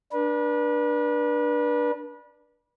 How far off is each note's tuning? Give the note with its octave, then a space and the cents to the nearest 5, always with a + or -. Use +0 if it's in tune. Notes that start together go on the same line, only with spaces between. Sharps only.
D4 +10 B4 -35